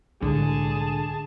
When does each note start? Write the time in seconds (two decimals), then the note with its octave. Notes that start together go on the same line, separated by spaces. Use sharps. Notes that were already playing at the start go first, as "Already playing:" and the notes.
0.22 C2 A2 D3 G#3 G#4 A5